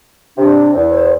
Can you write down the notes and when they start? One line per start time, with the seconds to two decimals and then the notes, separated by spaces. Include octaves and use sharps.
0.37 C3 D4
0.75 E2
0.91 C5